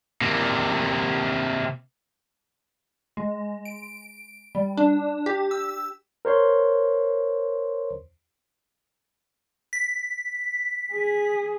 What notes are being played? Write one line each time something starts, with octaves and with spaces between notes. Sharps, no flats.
C3 A#3
G#3
D7
G3
D4
G4
E6
A#4 C5 C#5 C6
B6
G#4